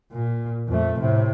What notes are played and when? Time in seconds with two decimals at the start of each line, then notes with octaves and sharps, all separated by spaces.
0.12 A#2
0.68 F2 A3
1.00 A2 C3